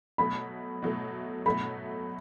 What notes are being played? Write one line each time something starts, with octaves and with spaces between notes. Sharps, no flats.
B2 F#3 A3 B5
B2 F#3 A3
B2 F#3 A3 B5